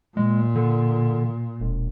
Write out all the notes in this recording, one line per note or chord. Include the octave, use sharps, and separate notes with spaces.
A#2 G#3
D3
E1